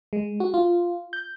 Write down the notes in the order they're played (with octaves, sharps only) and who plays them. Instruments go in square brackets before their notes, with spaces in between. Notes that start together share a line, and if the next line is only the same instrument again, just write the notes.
[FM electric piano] G#3
F#4
F4
G6